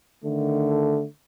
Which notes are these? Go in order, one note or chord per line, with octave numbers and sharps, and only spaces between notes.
D3 D#3 A3